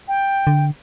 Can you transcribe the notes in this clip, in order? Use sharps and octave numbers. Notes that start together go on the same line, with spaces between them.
G5
D3